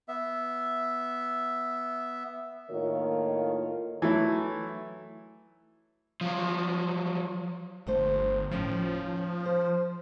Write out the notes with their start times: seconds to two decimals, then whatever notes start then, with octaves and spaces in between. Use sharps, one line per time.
0.08 B3 E5
2.70 A2 D#3 A#3 F4 A#4 C#5
4.02 E3 F#3 A3 E4
6.21 F3 F#3
7.87 G1 D2 A3 C5
8.51 D#2 A2 F3 C#4
9.45 C5